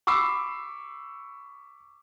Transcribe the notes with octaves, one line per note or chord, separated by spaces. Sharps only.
B5 C#6 D6 E6 C7